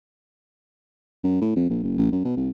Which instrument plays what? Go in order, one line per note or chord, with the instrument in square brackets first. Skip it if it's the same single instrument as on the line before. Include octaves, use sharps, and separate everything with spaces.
[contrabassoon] F#2
A2
F2
A#1
F#1
A1
F#2
B2
C2